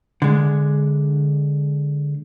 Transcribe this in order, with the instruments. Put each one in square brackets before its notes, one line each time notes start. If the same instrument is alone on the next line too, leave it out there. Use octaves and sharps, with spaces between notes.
[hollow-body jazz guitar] D3 G#3